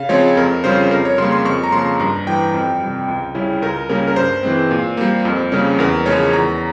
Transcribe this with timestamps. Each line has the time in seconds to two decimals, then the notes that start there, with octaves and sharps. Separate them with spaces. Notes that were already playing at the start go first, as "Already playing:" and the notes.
Already playing: C#3 F5
0.09 F3 G#3 C4 F4 C#5
0.37 F2 A#4
0.64 C#3 G3 C#4 F4 C5
0.91 F2 A#4
1.05 C#5
1.18 C#3 G3 A#3 C6
1.32 C6
1.45 F2 C#6
1.64 A#5
1.72 C#3 F3 A#3 C6
2.00 G2 A#5
2.26 E3 G3 G5
2.54 F2
2.81 C3 G3
3.08 C#2
3.35 C#3 G3 C#4 E4
3.62 C#2 A#4
3.89 C#3 G3 A#3 C#4 A#4
4.07 A#4
4.16 G2 C5
4.43 E3 G#3 C4
4.71 A#2
4.97 G3 A#3
5.25 F2
5.52 C#3 G3 A#3 C#4
5.79 E2 A#4
6.06 C#3 F3 G#3 C#4 C#5
6.33 E2 A#5